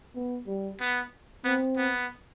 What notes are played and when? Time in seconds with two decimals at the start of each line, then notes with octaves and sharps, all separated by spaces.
0.15 B3
0.47 G3
0.81 B3
1.44 B3 C4
1.77 B3